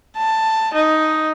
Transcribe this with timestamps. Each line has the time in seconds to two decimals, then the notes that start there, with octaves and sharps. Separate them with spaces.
0.17 A5
0.74 D#4